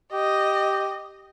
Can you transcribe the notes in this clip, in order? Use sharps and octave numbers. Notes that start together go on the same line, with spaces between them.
G4 D#5